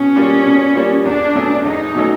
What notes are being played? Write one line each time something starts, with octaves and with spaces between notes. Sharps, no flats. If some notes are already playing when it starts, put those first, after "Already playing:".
Already playing: B2 C#4
G3 A#3 D4 F4
B2
G3 A#3 D4 F4
E2 D4
B2 F#3 A3 C#4
E2 D#4
B2 F#3 A3 C#4